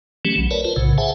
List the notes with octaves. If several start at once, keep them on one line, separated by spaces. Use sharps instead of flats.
E3 F#3 A3 C#4 G4
B1
A#4 B4 C#5 D5 A5
F4 A#4 C5
B1 A2 C#3
G#4 C5 E5 F#5 G#5 A5